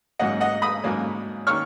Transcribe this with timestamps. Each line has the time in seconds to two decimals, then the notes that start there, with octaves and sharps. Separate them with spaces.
0.19 G#2 F#3 A#3 C#4 D#5 F#5
0.41 D#5 F#5
0.62 B5 D#6
0.83 G#2 F#3 A#3 C#4
1.47 D#3 A#3 C#4 C#6 F6